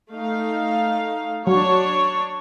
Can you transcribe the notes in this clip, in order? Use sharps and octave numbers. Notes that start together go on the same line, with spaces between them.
A3 D#4 F5
F#3 D4 C#5